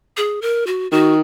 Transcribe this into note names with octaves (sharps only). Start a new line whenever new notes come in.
G#4
A#4
F#4
D#3 F#4